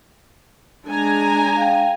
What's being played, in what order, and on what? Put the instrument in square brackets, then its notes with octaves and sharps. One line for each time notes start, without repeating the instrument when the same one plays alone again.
[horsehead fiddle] G#3 D4 [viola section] G#5 A#5
[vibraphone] F5 G5